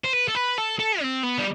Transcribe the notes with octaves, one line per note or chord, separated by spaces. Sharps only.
C5
B4
A4
B4
A4
A4
C4
B3
G3